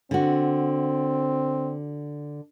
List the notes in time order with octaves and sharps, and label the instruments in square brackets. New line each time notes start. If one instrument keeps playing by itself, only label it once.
[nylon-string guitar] D3 F#4 [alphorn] C4